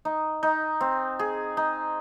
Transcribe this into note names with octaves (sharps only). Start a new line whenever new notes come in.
D#4
D#4
C4
G#4
D#4